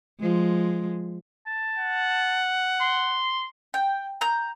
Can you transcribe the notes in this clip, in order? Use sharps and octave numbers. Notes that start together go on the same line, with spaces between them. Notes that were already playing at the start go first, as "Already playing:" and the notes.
F3 G#3
A5
F#5
C6
G5
A#5 G6